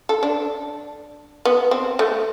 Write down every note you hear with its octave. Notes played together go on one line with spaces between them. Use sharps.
A4
D4
B3
C4
A3